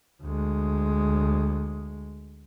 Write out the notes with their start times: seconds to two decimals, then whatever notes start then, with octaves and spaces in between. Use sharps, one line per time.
0.23 D2 G#3